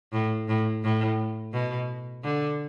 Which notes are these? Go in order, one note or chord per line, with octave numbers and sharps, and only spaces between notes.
A2
A2
A2
B2
D3